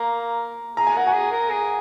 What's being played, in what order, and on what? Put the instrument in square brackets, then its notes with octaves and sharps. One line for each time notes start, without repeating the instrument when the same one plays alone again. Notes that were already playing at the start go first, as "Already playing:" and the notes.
Already playing: [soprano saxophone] A#3 [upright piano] A#5
[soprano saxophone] G#4 [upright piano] A#5
[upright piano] G#5
[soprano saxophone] A#4 [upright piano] F#5
[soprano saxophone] F#4 [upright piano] G#5
[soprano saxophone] G#4
A#4
G#4